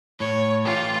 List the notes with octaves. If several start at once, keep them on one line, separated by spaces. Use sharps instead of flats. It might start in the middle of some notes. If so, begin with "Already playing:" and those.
A2 C#5
E3 A3 C#4 F4 G4